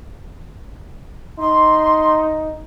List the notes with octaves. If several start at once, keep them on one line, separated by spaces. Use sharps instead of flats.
D#4 C6